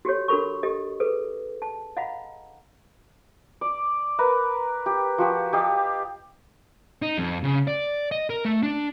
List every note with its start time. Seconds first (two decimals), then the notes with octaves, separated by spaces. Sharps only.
0.05 F#4 G4 A4 C#5
0.28 D4 F#4 A4 A#4 B5 C#6
0.63 G4 A4 D#5
1.00 G#4 A4 B4
1.62 A5
1.97 D#5 F5 F#5 A#5 B5
3.61 D5
4.19 A#4 B4 A#5
4.86 G4
5.18 F3 F#4 G4
5.53 G4 D#5 F5 A5
7.02 D#4
7.18 F2
7.44 C#3
7.68 D5
8.12 D#5
8.30 A#4
8.45 A3
8.63 D4